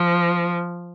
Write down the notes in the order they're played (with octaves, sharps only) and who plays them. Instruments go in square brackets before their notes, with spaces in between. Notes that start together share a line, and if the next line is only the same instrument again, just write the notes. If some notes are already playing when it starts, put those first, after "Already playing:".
Already playing: [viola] F3